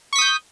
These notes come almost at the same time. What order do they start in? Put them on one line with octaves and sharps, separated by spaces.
C#6 B6 D#6 G6